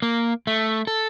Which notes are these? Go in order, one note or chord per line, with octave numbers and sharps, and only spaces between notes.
A#3
A3
A4